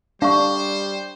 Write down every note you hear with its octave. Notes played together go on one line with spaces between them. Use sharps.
G3 D4 C5 F5 C#6